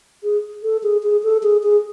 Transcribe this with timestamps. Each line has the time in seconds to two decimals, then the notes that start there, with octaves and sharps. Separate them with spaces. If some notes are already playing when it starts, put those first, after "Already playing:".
0.23 G#4
0.63 A4
0.83 G#4
1.03 G#4
1.23 A4
1.43 G#4
1.63 G#4